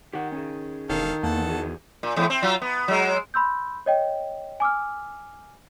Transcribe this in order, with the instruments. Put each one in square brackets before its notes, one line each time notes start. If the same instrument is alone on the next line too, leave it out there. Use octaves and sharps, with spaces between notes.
[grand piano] D#3 [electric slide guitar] G4 F#5
[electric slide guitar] C#4 G#4
[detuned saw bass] E1 [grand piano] D#3 [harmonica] D#4 A4 F5
[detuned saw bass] E2 [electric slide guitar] A#3 [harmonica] A4 F#5 A5
[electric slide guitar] F#4 G#4
[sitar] A#2
E2 A2
C4
F#3 F4
B3
F#3 G#3
[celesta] B5 C6 E6 G6
C#5 D#5 G5
G#5 D6 E6 F6